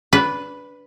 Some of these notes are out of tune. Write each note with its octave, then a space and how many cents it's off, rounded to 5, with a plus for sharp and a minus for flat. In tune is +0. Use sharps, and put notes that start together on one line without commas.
D4 -20 B4 +0